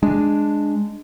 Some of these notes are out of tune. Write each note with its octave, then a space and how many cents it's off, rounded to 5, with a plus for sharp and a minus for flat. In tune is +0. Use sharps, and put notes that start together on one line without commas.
G#3 +0 D4 +0